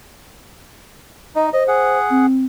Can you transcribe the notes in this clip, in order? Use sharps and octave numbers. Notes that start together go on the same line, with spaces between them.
D#4 D#5
C5 D#5
G#4 F#5
C4